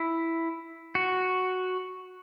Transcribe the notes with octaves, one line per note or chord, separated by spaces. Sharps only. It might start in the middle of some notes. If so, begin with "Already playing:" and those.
Already playing: E4
F#4